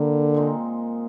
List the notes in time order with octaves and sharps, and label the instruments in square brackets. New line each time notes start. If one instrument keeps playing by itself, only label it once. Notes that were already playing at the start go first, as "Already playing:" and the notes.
Already playing: [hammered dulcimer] A#2 G3 A#3 [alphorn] D3
[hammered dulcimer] A#2 G#3 C4 D#4